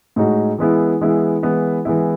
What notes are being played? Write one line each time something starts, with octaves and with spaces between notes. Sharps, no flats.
A2 G#3 D#4 F#4
E3 G#3 B3 E4
E3 G#3 B3 E4
E3 G#3 B3 E4
E3 G#3 B3 E4